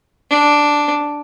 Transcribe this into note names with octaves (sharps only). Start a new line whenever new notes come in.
D4